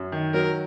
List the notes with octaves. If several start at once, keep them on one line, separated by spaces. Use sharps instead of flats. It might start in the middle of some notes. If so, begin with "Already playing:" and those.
Already playing: F#2
D#3
F#3 A#4